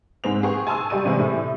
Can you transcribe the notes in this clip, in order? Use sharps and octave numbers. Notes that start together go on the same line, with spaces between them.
G#2 G#3 C4 F7
G#4 B4 G5 C#6
G#5 A5 C6 D#6 E6
G3 G4 D5 C#6 D#7
C3 E3 G#3
A2